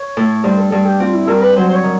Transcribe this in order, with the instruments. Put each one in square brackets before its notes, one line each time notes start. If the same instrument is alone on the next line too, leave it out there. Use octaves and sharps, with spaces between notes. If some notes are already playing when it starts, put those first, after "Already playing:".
Already playing: [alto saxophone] C#5
[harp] A2
[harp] G2 [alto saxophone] C5
[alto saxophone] A4
[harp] G2 [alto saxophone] A4
[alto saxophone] G4
[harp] C4 [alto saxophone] F4
[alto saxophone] E4
[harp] G2 [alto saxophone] A#4
[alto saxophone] B4
[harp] F#3 [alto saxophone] C5
[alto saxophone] C5
C#5
[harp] D#3